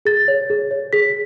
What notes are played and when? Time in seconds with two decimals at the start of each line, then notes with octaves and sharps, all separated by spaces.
0.05 G#4 A6
0.28 C#5
0.50 G#4
0.71 C#5
0.93 G#4 B6